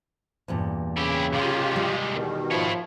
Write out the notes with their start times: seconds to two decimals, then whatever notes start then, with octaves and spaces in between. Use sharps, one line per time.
0.48 E2 G2 A#2
0.97 C#3 E4 G4
1.33 C3 G#3 F4 G4
1.76 G3
2.14 E2 B2 D#3
2.51 F3 E4 C#5